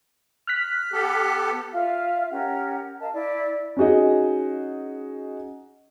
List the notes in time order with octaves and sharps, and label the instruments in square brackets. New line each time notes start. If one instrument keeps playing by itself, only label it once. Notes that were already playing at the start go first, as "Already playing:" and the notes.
[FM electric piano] F6 F#6 B6
[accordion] B3 G4 A4
[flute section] F4 E5 F5
C#4 G4 A#4 F#5
A#4 D#5 F5 A5
E4 D5
[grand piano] C#4 D#4 F#4 G#4 D#5